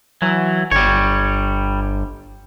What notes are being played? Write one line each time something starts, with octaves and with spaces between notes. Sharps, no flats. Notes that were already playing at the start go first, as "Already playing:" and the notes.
E3 F#3
G1 G3 C#5